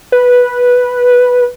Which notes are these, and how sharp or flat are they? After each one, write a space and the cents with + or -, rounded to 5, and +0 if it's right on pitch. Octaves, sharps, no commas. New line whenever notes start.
B4 -5